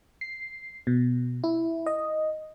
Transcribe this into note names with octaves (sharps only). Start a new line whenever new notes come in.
C7
B2
E4
D#5